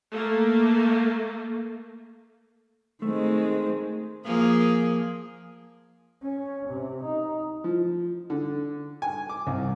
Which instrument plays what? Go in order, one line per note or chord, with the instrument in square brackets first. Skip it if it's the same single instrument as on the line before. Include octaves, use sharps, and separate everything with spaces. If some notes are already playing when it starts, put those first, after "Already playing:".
[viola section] A3 A#3
[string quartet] D#3 G#3 C4 [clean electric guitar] A3
[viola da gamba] F3 A#3 G#4
[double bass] C#4
C3
D#4
[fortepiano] F3
D3
G#5
D6
C2